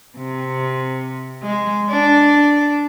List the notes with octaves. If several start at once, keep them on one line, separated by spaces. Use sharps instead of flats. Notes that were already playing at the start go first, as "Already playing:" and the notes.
C3
G#3
D4